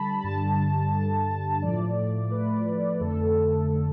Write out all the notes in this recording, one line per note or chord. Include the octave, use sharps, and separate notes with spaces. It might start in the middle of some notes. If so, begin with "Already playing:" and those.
Already playing: D3 G3 A5 B5
G2 D3 G3 A5
G2 D3 G3
A2 F3 A3 D5
A2 F3 A3 B4
F2 D3 A3 A4
D3 A3